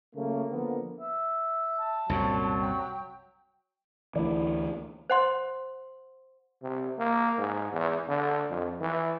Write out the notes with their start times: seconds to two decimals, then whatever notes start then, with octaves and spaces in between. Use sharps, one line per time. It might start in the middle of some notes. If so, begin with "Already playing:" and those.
0.14 C#3 F#3 A3 A#3
0.51 D3 F3 A#3 B3
1.00 E5
1.78 A5
2.09 C2 F#2 A#2 F#3
2.61 G5
4.16 D2 E3 E4 D5
5.10 C5 F#5 C6
6.63 C3
6.99 A#3
7.38 G#2
7.72 E2
8.08 D3
8.50 F2
8.81 E3